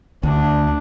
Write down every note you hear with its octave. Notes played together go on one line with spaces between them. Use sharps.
D2 D4